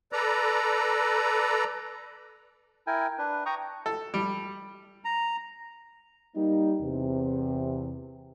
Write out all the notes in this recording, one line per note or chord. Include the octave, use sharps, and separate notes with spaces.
A4 B4 D5 A#5
E4 A#4 G5 G#5
D4 B4
G5 A#5 C#6 D#6
A4
G3
A#5
G3 A#3 D#4
E2 C3